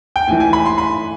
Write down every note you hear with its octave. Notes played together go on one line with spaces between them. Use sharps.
G5
A2 E3 G#5
G#5
B5
C6
B5